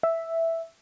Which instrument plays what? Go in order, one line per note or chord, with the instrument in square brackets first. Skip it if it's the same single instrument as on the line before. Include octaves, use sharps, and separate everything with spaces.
[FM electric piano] E5